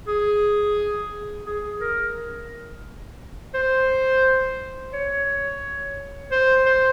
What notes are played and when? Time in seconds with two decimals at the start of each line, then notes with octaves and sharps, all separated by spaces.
0.07 G#4
1.46 G#4
1.81 A#4
3.54 C5
4.93 C#5
6.31 C5
6.66 C5